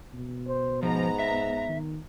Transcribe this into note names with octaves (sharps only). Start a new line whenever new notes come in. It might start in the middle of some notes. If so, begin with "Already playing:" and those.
B2
C5
G#2 F3 B3 A#5
E5
D#3